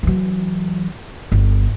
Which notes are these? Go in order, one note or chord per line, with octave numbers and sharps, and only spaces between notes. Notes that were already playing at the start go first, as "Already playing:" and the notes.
E3 F#3
G1